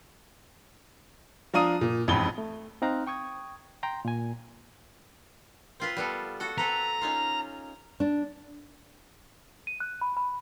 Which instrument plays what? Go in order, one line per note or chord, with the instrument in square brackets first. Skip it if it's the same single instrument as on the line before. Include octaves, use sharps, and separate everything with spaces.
[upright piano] F3 D4 F5 A#5 D#6 D#7
A#2
A1 F2 G#2 B5 G7
[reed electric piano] A3
C4 D#4 F5 A#5 F6 F#6
G5 C#6 D#6 G#6
G5 A#5 C6
A#2 G#5
[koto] C4 F4 B4
G3 B3 A4
F#4 A4
[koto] C4 A4 B4 [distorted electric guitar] A#5
[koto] C#4 D#4 F4
[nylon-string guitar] D4
[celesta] D#7
F#6
B5
B5